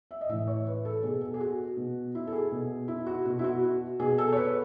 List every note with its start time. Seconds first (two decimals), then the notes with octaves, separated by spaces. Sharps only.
0.11 E5
0.21 D#5
0.29 A2 E3 E5
0.47 C#5
0.66 B4
0.85 A4
1.03 B2 G#4
1.21 A4
1.34 G#4
1.40 F#4
1.77 B2
2.15 E4
2.27 A4
2.32 G#4
2.51 B2
2.88 E4
3.06 F#4
3.25 B2 F#4
3.39 E4
3.44 F#4
3.63 F#4
3.99 B2 G#4
4.18 A4
4.32 C#5
4.37 B4